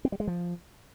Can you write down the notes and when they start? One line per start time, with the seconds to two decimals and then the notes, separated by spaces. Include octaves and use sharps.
0.05 C4
0.12 G3
0.20 G#3
0.27 F3